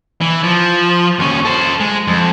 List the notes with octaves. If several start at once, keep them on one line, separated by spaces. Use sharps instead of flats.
E3
F3
D#2 C#4
A4 C5
G#3
F2